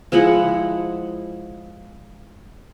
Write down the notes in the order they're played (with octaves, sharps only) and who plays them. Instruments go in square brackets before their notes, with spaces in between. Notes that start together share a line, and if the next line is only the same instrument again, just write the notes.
[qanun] F3 G#3 E4 F#5